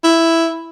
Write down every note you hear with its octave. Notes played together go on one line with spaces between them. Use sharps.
E4